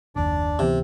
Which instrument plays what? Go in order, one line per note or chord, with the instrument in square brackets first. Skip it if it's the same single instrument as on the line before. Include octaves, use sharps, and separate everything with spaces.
[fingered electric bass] F#1 D#2 [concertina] D4 D5
[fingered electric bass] D1 E3 B3 [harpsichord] C3